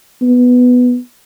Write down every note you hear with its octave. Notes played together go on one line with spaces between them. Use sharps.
B3